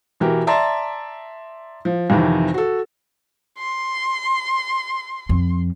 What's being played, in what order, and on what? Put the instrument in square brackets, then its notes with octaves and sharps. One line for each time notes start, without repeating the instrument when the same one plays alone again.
[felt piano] B2 E3 G4 A#4
D5 E5 A5 A#5 C6 A6
F3
F2 C3 D#3 E3
F#4 A4
[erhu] C6
[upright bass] F2